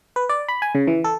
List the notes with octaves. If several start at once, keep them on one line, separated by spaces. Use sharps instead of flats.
B4
D5
B5
G#5
C#3
E3
A4